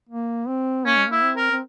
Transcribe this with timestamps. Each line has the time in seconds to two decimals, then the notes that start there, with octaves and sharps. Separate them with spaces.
0.09 A#3
0.48 C4
0.86 A#3 C#4
0.97 G#3
1.07 A#3 E4
1.23 C4
1.37 A#4
1.51 C4